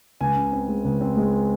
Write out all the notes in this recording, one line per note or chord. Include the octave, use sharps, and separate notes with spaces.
C#2 G#5
C#3
C4
G#3
C#2
C4
G#3